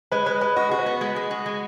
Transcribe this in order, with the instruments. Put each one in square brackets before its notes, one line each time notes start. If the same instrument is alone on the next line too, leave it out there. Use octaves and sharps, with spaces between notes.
[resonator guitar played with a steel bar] G#3 [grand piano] B4
[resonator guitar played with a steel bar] G#3 [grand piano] B4
[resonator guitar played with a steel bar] G#3 [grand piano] B4
[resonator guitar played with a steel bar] F#4 [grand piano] D#5
[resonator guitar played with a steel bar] F#4 [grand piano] G#4
[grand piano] B4
[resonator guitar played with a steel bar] B3
G#3
G#3
F#4
G#3